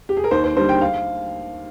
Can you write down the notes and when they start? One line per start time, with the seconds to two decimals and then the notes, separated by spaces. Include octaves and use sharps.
0.09 G4
0.17 G#4
0.24 A#4
0.31 D#2 C5
0.44 C5
0.56 D3 G3 C5
0.69 G5
0.81 F5